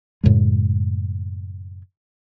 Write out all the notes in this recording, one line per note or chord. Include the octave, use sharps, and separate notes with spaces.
F#2 A2 C#3 G#3